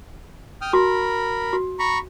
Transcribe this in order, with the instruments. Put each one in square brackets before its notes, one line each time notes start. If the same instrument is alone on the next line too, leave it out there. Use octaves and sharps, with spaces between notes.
[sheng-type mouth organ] G5 D#6 F6
[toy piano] F#4 [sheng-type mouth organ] A#4 B5
[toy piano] F#4
[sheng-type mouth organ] A#5 B5 C#6